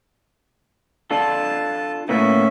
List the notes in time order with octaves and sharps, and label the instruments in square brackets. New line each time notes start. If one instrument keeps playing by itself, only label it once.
[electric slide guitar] D4 F4 A4 [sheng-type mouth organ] A5
[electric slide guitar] A2 A#3 B3 [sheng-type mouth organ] C#4 E5